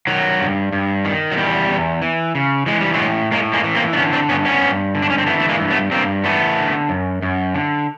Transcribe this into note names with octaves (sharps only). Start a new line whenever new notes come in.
D#3 F#3
G2
G2
D#3
F#3
E2 G3
E2
E3
C#3
E3 G#3
G3
F#3 G#3
A2
A2 G#3 A#3
G#3 A#3
E3
A#3 C4
D4
D3 B3 C#4
C4 D4
G2 B3 C#4
B3 C#4
G2
D3
D4
C#4
C4
E3 A3 B3
A3
G#3 A#3
G2
A3 B3
G2 A#3 C4
E3 A3 B3
D3
F#2
F#2
D3